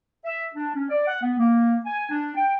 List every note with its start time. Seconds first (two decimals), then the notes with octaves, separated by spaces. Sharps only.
0.24 E5
0.54 D4
0.75 C#4
0.89 D5
1.07 F#5
1.22 B3
1.38 A#3
1.85 G#5
2.10 D4
2.36 G5